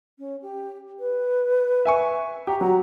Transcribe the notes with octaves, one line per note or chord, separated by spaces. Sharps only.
C#4
G4
B4
E5 G#5 C#6
G4 A#5
F#3 A#5